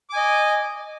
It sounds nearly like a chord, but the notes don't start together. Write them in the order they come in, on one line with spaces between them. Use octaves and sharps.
D6 G#5 D#5